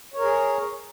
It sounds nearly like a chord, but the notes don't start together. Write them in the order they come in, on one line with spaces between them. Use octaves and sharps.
C#5 A#4 G#4